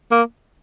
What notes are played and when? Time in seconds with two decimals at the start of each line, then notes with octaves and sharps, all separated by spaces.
0.11 A#3